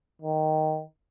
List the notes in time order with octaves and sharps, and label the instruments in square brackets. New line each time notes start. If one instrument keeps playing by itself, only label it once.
[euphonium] D#3